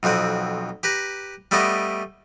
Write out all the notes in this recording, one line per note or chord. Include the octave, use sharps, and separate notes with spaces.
B1 F2 C4 F#5 D#6
G4 B4 A#5
G3 A3 B3 D5 D#5